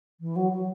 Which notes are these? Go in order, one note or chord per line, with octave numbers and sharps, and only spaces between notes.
E3
F#3
F#3